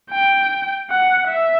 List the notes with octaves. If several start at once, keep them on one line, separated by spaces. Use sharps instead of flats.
G5
F#5
E5